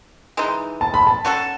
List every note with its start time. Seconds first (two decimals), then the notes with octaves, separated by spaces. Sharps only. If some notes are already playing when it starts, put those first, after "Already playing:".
0.37 E3 G#3 D#4
0.81 A5
0.94 B5
1.07 A5
1.25 F#3 C#4 F#4 A4